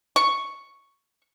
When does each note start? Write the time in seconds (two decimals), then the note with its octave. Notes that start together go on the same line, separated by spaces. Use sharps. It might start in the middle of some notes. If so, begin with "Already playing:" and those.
0.16 C#6